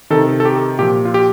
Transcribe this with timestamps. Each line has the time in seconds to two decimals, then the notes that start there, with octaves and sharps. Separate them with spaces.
0.10 C3 D#3 A4
0.40 A4
0.45 G4
0.79 A#2 F3 G4
1.05 F4
1.14 G4